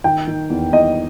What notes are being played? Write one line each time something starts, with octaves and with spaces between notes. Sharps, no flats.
D#3 G5
D#3
E2
E2 D#5